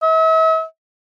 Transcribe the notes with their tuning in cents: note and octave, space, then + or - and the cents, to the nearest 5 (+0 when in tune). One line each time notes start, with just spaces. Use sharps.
E5 -40